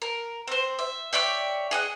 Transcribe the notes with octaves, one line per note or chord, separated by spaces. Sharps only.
A#4
C4 C5
E5
C#5 D5 E5 G5
G#4 D#5 F#5